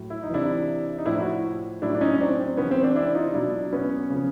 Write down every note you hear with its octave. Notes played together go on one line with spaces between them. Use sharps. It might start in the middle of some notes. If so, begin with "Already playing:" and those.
Already playing: A2 F#3
E4
D#4
C3 E3 D4 E4
D#4
A2 F3 D4 E4
E4 F#4
A2 F#3 D4 E4
D4
C#4 D#4
C4 D4
C4
C3 E3 B3 C#4
C4
C4 D4
D4 E4
D#4 F4
B2 F#3 D4 E4
B3 C#4
C#3 F3